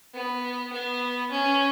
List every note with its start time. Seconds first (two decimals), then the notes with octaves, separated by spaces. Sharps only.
0.14 B3
0.73 B3
1.31 C#4